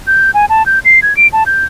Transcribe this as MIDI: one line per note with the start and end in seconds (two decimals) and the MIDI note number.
0.07 0.31 91
0.34 0.45 80
0.50 0.66 81
0.66 0.79 91
0.85 1.00 96
1.03 1.16 92
1.17 1.27 98
1.33 1.44 81
1.46 1.65 91